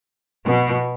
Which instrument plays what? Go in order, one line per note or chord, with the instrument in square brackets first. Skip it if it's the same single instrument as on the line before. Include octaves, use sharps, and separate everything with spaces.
[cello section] B2